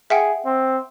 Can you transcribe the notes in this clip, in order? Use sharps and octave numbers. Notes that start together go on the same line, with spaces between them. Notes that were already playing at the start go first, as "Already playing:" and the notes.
G#4 E5 F#5 G5
C4